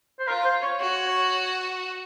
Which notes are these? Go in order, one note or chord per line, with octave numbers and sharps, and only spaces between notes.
C5
F4 A#4
C5
C#5
F#4 C#5
C#5